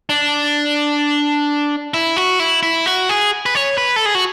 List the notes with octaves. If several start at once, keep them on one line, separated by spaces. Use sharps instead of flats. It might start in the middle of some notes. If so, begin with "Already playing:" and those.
D4
E4
F#4
E4
E4
F#4
G#4
B4
C#5
B4
A4
G#4
F#4